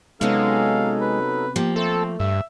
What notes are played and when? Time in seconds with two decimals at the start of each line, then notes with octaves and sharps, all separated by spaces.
0.21 C3 F#3 G#3 B3 C#4 D#4 A4 F5
1.01 B4
1.56 F3 A#3 G4
1.76 A3 C4 A4
2.20 G2 E5